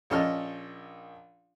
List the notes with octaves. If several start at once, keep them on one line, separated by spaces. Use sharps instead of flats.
A#1 C#4 A4 D#5 A5 F6